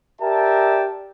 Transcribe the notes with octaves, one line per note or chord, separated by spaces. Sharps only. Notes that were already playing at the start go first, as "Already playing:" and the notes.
G4 A#4 D5 E5 G5 A5